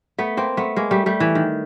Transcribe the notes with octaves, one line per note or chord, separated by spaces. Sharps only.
A3 B3
A#3 C4
A3 B3
G#3 A#3
G3 A3
G3 A3
E3
D#3